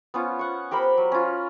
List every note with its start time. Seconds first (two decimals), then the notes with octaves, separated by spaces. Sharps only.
0.14 B3 C#4 F4
0.39 F#5 C#6
0.71 G4 A#4 C5 B5
0.97 F#3
1.12 C#4 F4